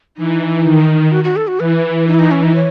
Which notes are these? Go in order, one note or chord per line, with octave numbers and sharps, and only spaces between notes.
E3 D#4
D#3
F#4
F#4
A4
F#4
E3 B4
E3 D#4
E4
D#4
C#4
D#4
C#5